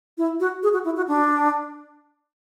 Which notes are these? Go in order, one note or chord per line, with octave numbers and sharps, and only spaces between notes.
E4
F#4
G#4
F#4
E4
F#4
D4